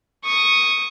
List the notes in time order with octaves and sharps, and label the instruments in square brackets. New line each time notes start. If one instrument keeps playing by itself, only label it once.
[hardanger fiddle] C#6 D#6